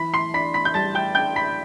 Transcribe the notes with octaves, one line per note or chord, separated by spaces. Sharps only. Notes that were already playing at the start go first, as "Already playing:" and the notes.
Already playing: E3 B5 B6
C6 C7
D4 B5 B6
B5 B6
G6
G3 A5 A6
G5 G6
D4 G5 G6
B5 B6